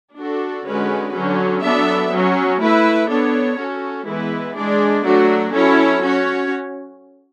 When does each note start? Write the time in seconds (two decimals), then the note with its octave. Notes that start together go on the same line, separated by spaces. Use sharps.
0.16 D4 F#4 A4
0.64 D3 G#3 C#4 F#4 B4
1.13 D3 F#3 C#4
1.62 F#3 B3 D4 A4 E5
2.11 F#3 C#4 F#4
2.60 A3 E4 B4 E5
3.09 B3 D4 A4 C#5
3.58 C#4 F#4 A4
4.06 E3 G#3 B3 E4 B4
4.55 G#3 D4 G#4 D5
5.03 F#3 A3 D4 F#4
5.53 F#3 C#4 E4 A4 C#5
6.02 C#4 F#4 C#5